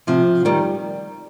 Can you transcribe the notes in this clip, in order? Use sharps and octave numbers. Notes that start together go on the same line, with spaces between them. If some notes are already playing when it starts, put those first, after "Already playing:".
C3 F3
D#3 G3